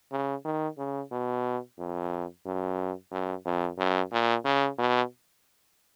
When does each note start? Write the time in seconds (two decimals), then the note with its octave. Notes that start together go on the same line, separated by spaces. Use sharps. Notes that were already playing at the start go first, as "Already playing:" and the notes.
0.12 C#3
0.45 D#3
0.78 C#3
1.12 B2
1.78 F2
2.45 F#2
3.11 F#2
3.45 F2
3.78 F#2
4.12 A#2
4.45 C#3
4.78 B2